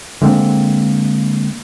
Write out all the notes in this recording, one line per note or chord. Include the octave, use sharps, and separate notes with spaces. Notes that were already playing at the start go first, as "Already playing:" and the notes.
D3 G#3 A#3 C4